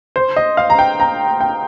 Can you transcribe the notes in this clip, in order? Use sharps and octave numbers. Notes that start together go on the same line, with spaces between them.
C5
D#5
F5
A#5
G5
A#5
G5